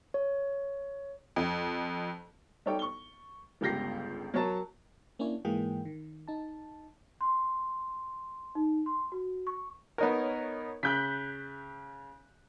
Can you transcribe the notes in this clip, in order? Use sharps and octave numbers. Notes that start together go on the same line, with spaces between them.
C#5
F2
G3 D#4 A4 C#5 D5 G5
C#6 G7
G1 C#2 G4 G6 A#6 C7
F#3 A#4 C#5 A5 A#5
A#3 C#4 D4 E4 C#5
G#2 E3 G#3 A#3 G#4 G5
D#3
D#4 A5
C6
D#4
C6
F#4
C#6
B3 D#4 A#4 C#5
C#3 F#6 G6 B6